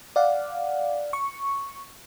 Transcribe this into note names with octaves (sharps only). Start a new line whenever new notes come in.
D5 F5 F#5
C#6